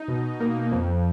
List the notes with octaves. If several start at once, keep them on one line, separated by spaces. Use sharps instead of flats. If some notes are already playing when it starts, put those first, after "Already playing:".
Already playing: D#4
B2
A#3
F2